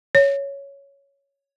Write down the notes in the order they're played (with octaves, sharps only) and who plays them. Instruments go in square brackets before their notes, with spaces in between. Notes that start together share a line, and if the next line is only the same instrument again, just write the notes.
[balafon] C#5